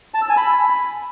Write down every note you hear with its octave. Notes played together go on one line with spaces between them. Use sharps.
A5
E6
G#5
B5